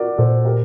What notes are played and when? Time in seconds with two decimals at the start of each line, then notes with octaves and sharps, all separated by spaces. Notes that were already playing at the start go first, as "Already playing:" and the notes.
Already playing: F#4 A#4 D5
0.18 A#2 A4 C5
0.45 G4 A#4